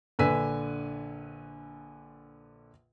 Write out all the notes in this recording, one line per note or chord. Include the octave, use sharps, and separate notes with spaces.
A#1 D3 B4 G#5 E6 B6